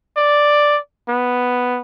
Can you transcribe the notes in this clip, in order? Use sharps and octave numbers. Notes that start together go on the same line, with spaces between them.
D5
B3